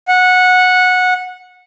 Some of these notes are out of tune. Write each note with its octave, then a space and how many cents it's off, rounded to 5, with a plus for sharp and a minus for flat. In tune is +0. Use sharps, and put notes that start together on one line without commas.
F#5 -15